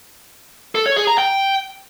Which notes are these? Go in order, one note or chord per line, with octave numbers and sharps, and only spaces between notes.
A4
C#5
G#4
A#5
G5